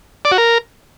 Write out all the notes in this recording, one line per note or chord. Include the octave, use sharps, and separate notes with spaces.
D5
F#4
A#4